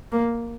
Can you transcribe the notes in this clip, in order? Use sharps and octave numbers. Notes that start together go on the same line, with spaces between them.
A#3